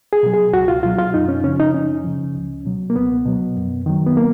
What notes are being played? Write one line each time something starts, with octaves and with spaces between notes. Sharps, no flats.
G#4
B2 F#3
G#4
C#2 F#4
F4
B2 F#3 F4
F4
F#2 D#4
C#4
C#3 F3 C#4
D#4
F#2 C#4
C#3 F3
C#2
B2 F#3
A#3
C#2 B3
B2 F#3
F#2
D#3 F#3
B3
A#3